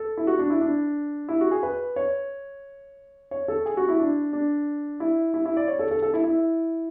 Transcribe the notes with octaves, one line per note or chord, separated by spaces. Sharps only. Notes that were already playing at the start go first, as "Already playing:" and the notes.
Already playing: A4
E4
F#4
D4
E4
D4
E4
F#4
G#4
B4
C#5
C#5
A4
G#4
F#4
E4
D4
D4
E4
E4
E4
D5
C#5
A4
A4
A4
E4
E4